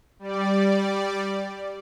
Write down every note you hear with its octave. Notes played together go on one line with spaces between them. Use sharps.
G3 D5